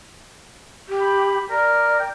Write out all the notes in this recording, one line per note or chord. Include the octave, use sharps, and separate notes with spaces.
G4
B5
A#4 D5
G5